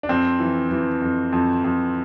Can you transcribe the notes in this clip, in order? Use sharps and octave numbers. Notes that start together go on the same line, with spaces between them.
D4
F2 C4
E3
E3
F2
F2
F2